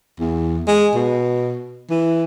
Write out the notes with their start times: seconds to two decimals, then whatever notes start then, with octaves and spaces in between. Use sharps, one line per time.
0.20 E2
0.67 G#3
0.95 B2
1.90 E3